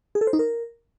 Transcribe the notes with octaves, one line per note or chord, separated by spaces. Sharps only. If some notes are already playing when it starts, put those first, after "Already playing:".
G#4
A4
C5
D#4
A#4